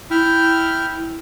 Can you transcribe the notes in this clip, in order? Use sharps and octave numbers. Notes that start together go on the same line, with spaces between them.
E4 G5 F6